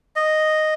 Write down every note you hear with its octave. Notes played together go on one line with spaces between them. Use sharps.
D#5